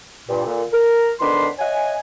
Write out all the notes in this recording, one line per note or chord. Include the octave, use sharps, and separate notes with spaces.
G2 A#2
A#2 D3
A#4
F2 D#3 B3 D4 B5 C6
C#5 D#5 E5 F#5 G#5